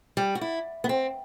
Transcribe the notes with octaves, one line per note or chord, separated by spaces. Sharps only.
G3
F#4
E4
B3
C4